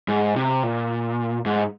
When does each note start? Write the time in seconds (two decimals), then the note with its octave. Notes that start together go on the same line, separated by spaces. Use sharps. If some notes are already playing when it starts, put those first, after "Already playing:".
0.08 G#2
0.36 C3
0.63 A#2
1.46 G#2